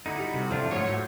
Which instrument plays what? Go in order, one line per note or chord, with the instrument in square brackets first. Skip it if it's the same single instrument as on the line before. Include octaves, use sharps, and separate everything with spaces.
[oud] D3 [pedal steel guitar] D#4 E4 [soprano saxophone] F#4
[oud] G3
[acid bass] C3
[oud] A2 A3 E4 [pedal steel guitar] F3 D4 F4
[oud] G#2 F#3 F#4 [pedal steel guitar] A3 A#3 F4 [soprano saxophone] C#5
[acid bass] A2 [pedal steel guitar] C5